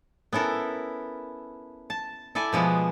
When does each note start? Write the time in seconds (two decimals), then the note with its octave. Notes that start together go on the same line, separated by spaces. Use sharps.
0.33 B3 C#4 E4 A4 A#4
1.90 A5
2.35 E4 A4 D5 G#5
2.53 B2 F3 G#3 B3